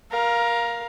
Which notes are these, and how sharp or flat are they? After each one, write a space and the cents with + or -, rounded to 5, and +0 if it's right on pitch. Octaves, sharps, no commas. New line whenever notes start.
A#4 +20 F5 +0